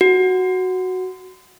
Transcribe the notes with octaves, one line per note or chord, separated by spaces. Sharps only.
F#4